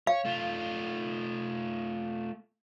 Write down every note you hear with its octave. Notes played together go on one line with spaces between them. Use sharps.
C#5 F5
A3 F4